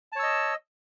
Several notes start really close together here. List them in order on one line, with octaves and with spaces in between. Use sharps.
A5 C#5 E6 D#5